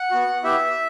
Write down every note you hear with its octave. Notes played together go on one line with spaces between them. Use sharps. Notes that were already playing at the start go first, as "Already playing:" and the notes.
Already playing: F#5
B3 F#4
B3 E4 G4 E5